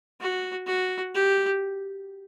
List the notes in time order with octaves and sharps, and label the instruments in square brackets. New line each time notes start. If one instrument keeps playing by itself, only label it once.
[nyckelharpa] F#4
F#4
G4